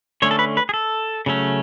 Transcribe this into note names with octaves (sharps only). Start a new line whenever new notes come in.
D3 A3 C#4 C#5
A4
B4
B4
G#4
A4
C#3 F#3 A3 C#4